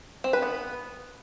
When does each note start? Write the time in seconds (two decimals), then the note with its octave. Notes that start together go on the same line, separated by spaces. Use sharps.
0.24 C4
0.33 B4
0.42 B3